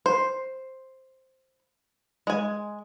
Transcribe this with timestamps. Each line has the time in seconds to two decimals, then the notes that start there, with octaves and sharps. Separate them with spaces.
0.06 C5
2.27 G#3 G#5